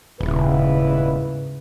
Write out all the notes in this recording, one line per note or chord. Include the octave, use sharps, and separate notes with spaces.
D#1 E2 G#2 C#3 E4 B4